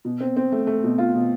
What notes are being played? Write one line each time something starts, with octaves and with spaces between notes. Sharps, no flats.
B2
C4
C4
A3
A3
B2
F4
B2